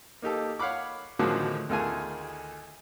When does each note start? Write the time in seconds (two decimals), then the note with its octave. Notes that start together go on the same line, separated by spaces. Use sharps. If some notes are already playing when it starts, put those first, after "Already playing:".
0.22 A#3 D#4 G4 A4
0.59 C#5 F5 F#5 B5 D6
1.19 A2 D3 D#3 F3 F#3 G#4
1.69 D2 D#3 A3 F4 G#4 G#5